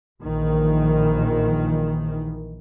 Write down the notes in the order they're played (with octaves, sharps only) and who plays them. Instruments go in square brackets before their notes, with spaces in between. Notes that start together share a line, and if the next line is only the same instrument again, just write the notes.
[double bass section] A#1 D#3 E3